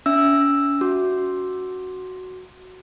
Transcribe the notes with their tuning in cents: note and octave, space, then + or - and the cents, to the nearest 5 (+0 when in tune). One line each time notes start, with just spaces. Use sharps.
C#4 +35 E5 +0 E6 +0
F#4 +0 D6 +0